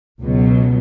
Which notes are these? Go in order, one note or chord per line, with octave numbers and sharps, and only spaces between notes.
C#2 B2 F#3